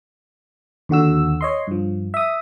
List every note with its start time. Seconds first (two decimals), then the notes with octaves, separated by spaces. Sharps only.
0.89 D#2 D3 F#4 E6
1.41 C#5 D#5 C6
1.67 G2 F3
2.14 E5 D#6